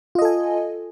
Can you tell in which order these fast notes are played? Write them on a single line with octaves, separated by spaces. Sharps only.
F4 D#5 A4 G#5